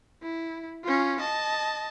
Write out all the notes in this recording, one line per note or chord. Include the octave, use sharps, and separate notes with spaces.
E4
C#4 F4
D#5 A5